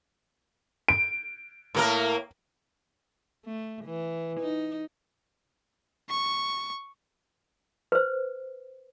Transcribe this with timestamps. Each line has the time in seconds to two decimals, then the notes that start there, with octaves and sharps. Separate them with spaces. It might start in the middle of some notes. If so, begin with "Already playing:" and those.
0.89 D7
1.74 A2 A#3 A#4
3.46 A3
3.85 E3
4.40 D#4
6.10 C#6
7.92 B4 C5